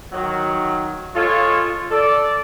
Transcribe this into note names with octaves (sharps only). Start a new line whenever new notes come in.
D#3 F#3
G#3 F4 A4 C#5
A4 D5